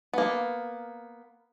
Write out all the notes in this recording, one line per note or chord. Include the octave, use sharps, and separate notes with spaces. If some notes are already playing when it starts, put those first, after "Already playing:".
A#3 B3